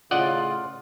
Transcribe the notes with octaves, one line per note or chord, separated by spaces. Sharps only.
A2 C#3 F4 D5 D#5 F#5